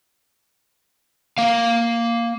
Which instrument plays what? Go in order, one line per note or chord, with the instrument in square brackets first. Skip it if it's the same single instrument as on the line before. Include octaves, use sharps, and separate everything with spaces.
[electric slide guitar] A#3 F5